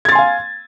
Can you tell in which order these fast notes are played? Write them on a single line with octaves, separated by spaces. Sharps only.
G#6 A6 C6 G#5 F5